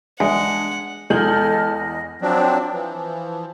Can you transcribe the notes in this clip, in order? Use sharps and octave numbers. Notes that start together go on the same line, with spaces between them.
E2 G#3 D4 F#5
E2 G#3 A4 D#5 F6 G6 F#7
D#5
F3 F#3 C4 D4
E3 F3